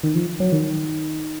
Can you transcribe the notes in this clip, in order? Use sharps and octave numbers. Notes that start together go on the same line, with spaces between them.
D#3
F3
F#3
D#3